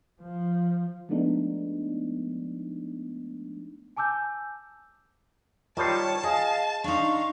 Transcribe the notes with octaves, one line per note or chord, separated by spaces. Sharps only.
F3
F3 G#3 A3 B3 D4 D#4
G#5 A5 D6 E6 G6
D#3 G3 F4 C5 C#5 A5
G#4 D#5 F5
D4 D#4 F5 C6 C#6